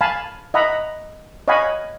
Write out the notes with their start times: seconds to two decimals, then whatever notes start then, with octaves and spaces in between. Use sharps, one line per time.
0.01 F5 G#5 A5 B5
0.54 D#5 E5 F#5 A#5 B5
1.48 C#5 D#5 F5 F#5 G#5 B5